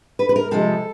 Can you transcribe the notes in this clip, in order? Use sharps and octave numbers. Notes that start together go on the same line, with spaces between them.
B4
B4
A#4
C3 F3 G#3 A4